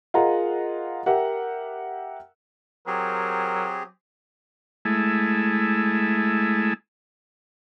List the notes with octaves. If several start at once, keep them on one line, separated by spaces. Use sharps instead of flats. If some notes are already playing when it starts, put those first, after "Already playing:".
F4 G#4 A#4 D#5 F#5 A#5
G4 A#4 E5 F#5
F#3 C4 G4 G#4 A#4
G#3 A3 E4